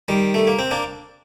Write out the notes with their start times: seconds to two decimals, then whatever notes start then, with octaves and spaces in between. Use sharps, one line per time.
0.08 D#3 G3
0.34 A3
0.47 A#3
0.59 C4
0.71 A#3 D4